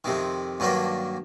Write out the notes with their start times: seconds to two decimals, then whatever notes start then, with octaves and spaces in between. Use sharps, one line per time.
0.04 F2 C3 D#3
0.60 G2 D#3 F#3 A#3 D4